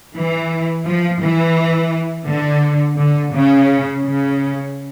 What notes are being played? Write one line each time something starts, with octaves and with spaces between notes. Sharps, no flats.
E3
F3
E3
D3
D3
C#3
C#3